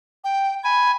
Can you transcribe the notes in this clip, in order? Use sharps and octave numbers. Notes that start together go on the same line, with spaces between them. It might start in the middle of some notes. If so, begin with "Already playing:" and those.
G5
G#5 B5